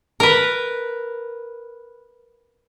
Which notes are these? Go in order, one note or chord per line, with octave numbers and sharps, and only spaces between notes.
A#4 B4